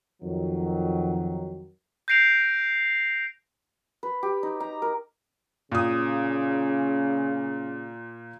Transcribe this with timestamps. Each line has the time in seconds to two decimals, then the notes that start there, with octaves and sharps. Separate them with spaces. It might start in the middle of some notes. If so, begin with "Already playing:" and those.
0.22 F2 D#3 F#3
2.08 G6 A#6 C7 D7 F7
4.03 B4
4.23 G4
4.43 D#4
4.60 A#5
4.82 A#4
5.72 A#2 C#3 D#6